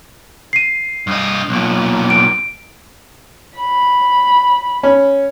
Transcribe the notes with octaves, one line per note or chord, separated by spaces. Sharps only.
C7 D#7
G2 D#5
B1 A#2
D7
B5
C#4